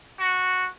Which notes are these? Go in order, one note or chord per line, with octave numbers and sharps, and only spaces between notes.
F#4